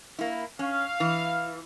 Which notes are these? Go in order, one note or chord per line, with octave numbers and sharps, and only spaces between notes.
A#3 E4
C#4 F5
E3